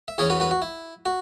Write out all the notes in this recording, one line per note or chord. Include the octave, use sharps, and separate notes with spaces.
E5
E2 E3 C#4 G#4 C#5
F#4 B4
F#4 B4
F#4
E4
F#4